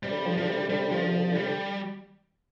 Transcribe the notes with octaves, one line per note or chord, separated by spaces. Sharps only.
C3 G3
D3
C3
D3 F3
C3
D3 F3
C3 G3
D3
C3
D3 G3
C3
D3
C3 F3
D3
C3
D3
C3
D3
C3 G3
D3